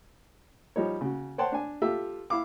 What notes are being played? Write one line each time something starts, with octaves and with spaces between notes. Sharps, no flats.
F3 G3 D#4 C#5
C#3 F#4
C5 C#5 F#5 G5 A5 C6
D4 G#5
F4 G4 A4 E5
E4 F5 D6